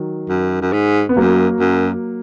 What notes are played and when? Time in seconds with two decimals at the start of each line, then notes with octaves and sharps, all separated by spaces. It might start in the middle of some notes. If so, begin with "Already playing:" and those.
Already playing: D#3 F#3
0.29 F#2
0.62 F#2
0.73 G#2
1.09 B3
1.17 F#2 F#3 A#3
1.60 F#2